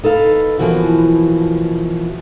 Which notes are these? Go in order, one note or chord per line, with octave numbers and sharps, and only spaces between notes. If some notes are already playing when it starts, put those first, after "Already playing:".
D#4 A4 B4 F5
B2 E3 F3 A#3 F#4